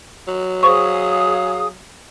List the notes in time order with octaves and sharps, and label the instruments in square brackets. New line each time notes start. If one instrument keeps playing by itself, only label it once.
[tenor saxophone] F#3
[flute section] G#4 F5 D#6 [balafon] C5 C#6